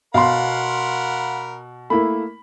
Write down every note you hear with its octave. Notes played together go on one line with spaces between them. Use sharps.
B2 A#4 F5 F#5 B5 C6
A3 A#3 E4 B5